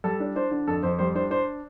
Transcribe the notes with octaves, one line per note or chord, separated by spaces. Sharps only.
G3 A4
D4
D4 C5
D3
F2 A4
F2 C5
G3 C5
D4 C5
D4 C5